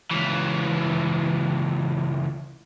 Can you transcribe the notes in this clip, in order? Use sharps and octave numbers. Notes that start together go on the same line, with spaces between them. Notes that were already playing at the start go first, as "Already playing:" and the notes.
C#2 E3